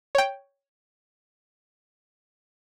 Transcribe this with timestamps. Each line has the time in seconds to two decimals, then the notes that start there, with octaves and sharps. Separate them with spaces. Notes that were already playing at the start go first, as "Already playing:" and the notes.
0.15 C#5 G5